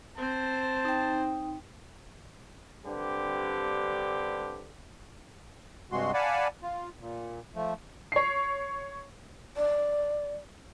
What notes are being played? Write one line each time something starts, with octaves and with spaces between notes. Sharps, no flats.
C4 C5 A5
D#4 G5
G2 D3 C4 G4
G2 C3 G#3 F#4 C6
D5 F5 F#5 G#5 A5 B5
F4
A#2
F3 A3
C#5 C7
D5